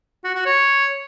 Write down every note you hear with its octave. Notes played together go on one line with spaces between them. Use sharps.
F#4
F#4
C#5